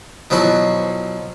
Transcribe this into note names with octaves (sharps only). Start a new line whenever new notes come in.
B2 F3 F#3 E4 F#4